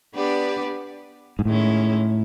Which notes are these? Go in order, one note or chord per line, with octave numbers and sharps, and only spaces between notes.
B3 D4 G4 B4 D5
G#2
A2 D#3 G#3 C#4 E4